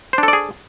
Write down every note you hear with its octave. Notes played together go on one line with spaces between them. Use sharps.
D4 G#4 A4 C5 D5